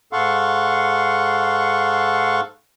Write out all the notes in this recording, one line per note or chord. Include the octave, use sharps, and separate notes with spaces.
G#2 A4 F5 F#5 C6 C#6